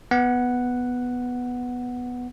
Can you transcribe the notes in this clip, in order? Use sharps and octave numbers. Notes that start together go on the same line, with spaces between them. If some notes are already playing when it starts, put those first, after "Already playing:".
B3 F#5